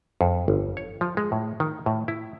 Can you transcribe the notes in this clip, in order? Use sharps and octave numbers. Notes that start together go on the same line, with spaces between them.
F2
G1
C#5
F3
G#3
A2
D#3
A2
E4